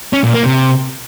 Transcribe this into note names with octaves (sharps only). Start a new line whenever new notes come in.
C#4
A#2
A#3
C3